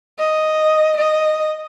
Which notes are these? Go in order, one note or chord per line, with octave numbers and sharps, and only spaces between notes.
D#5
D#5